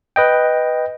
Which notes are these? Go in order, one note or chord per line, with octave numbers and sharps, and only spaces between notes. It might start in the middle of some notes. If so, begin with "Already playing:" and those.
B4 D#5 G5